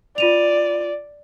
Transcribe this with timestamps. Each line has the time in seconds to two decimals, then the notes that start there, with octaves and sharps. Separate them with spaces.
0.18 F4 D5 D#7 F7